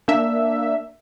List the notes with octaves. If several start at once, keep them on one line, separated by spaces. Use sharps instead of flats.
A#3 D4 E5